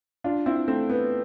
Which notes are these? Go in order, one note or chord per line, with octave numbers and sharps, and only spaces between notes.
D4 F4
C4 E4
A3 C4
B3